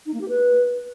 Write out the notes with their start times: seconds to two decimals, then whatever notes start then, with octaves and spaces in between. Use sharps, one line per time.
0.06 D#4
0.14 A#3
0.21 G4
0.29 B4